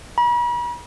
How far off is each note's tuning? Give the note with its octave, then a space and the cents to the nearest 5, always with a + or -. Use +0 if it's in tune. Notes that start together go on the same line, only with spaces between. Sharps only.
B5 -45